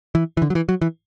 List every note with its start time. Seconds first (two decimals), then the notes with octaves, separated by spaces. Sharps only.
0.15 E3
0.37 E3
0.42 D3
0.50 F#3
0.55 E3
0.69 F#3
0.82 E3